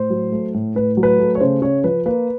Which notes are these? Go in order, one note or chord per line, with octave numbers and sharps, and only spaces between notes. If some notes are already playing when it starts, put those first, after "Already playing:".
Already playing: A2 C5
F#3
A3
A2
A2 B4
F#3
B4
A3
C#5
C#3 C5
C#3 C#5
F3 B4
A#3 B4